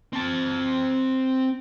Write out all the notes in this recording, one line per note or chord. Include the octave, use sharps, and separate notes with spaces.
C4 A5